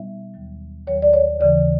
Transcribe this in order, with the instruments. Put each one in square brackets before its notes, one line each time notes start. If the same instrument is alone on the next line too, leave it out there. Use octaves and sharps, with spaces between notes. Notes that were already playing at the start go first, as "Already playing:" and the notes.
Already playing: [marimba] B2 G3 B3 D#4 E5
D#2 D#3 F#3
D#2 D#3 F#3 C#5
D5
C#5
D#2 C#3 E3 D5